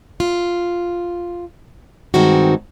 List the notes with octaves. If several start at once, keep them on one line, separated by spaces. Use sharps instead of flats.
F4
G2 D#3 G#3 C4 D#4 F#4